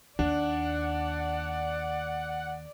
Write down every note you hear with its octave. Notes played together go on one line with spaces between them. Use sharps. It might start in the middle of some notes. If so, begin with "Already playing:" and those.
D#2 D4 D5 F#5